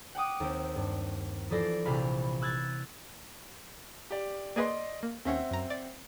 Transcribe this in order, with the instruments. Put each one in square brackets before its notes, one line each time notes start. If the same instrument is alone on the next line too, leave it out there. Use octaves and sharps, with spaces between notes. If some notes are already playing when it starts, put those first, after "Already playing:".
[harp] F#5 G5 D6 D#6
D#2 C4
G2
E3 F3 A4 D5 A#6 C7
A#1 C3 E3 F5 B5 B6
E6 F#6 G#6 A6
[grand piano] G4 D5
[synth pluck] A#3 G#4 B4 [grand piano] D5 D#5 C6
[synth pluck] A#3
[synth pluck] D#2 C#4 [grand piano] C4 E5 F#5
[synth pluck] F#2 A#5
D5